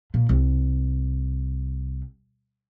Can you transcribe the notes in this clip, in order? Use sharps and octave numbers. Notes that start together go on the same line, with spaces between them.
A#2
C2